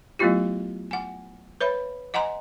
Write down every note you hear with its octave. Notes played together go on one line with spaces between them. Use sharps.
F#3 A3 B3 E4 F4 G4
F#5 G#5
B4 C#5 E5 B5
D#5 F#5 G#5 A#5 C6